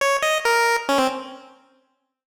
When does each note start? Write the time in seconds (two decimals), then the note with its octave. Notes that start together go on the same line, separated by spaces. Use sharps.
0.01 C#5
0.23 D#5
0.45 A#4
0.89 C#4
0.98 C4